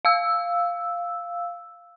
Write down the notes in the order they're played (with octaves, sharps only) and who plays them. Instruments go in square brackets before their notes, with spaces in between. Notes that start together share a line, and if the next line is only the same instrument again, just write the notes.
[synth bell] F5 E6